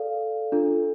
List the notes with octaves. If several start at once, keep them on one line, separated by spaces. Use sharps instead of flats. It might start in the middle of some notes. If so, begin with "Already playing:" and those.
Already playing: A4 D5 F5
D4 F4 A4